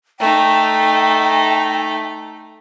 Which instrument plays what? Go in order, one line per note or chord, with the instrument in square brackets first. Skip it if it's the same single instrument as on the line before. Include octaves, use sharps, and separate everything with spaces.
[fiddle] A3 D#4 [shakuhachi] G5